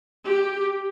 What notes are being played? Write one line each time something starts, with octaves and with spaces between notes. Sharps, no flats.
G4